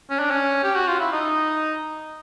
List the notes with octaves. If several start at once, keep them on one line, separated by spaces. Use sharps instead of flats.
C#4
D4
C#4
G4
F#4
F4
E4
D#4